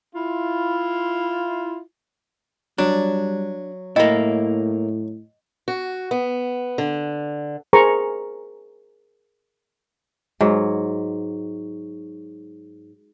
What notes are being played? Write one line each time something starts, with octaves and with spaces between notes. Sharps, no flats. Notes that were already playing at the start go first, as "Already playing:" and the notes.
E4 F4
F#3 G3 D4
A2 A#3 E4 D#5 G5
F#4
B3
D3
G#4 A#4 C5 A#5 C#6
G#2 F#3